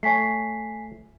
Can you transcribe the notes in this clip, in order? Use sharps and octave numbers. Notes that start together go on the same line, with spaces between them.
A3 C#5 G#5 B6 C7